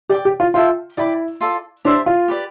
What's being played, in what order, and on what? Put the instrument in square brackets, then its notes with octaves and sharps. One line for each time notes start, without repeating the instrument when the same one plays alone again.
[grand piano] G4 [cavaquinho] D5 G5 D6
[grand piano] G4
F4
[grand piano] F4 [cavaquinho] A4 E5 G5 C6
[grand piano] E4 [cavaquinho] D5 G5 B5 D6
[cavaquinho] F4 A4 D5
[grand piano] D4 [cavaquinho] G4 C5 E5 A5
[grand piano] F4
[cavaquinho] G4 B4 D5